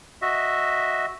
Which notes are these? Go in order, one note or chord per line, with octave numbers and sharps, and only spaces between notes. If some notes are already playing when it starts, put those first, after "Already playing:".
F#4 D#5 E5